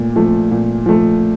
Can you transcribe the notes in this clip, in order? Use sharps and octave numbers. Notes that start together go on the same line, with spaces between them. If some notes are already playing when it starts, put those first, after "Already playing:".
Already playing: A#2 A3
F3 A3
A#2
F3 A3